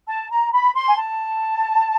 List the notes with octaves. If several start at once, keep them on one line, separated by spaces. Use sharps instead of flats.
A5
A#5
B5
C6
G#5
A5